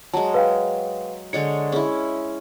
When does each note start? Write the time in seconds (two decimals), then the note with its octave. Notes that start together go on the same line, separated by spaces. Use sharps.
0.14 F#3 G#3 A5
0.34 B4 F5 G5
1.33 D3 G#3 C#5 C#7
1.72 C#4 E4 G#4